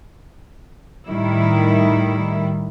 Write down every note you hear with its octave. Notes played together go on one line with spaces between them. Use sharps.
A2 D#3 G3 E4